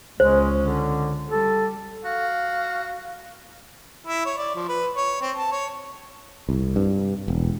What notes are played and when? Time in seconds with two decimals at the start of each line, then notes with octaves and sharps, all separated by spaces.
0.20 C#2 G#3 C#4 C5
0.58 D3
1.30 G3 A4
2.05 F#4 F5
4.07 E4
4.26 C#5
4.37 D5
4.55 F3
4.68 B4
4.97 C#5
5.22 C4
5.36 A5
5.52 C#5
6.49 C2
6.76 G2
7.28 E1